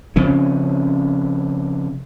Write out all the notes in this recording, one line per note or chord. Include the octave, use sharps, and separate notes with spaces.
C#3 F3 C4 C#4